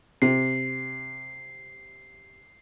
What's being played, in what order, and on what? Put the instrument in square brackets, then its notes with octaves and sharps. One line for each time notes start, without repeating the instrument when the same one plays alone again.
[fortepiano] C3 [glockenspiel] C7